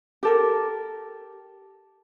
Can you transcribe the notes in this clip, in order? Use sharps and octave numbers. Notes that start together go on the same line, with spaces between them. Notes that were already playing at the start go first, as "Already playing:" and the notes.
G4 A4 A#4